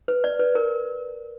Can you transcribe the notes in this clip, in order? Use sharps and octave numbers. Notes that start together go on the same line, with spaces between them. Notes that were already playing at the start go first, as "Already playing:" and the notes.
B4
D5
B4
A#4